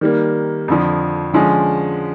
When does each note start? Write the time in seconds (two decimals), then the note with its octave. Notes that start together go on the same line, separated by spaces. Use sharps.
0.01 D#3 G3 A#3
0.68 F2 D3 F3
1.34 D3 F3 G#3 C#4